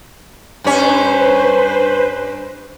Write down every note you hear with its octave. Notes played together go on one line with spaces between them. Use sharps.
G2 C#4 B4 C5